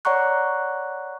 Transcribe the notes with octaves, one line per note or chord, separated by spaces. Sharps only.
C#5 D5 F#5 A#5 C#6 F#6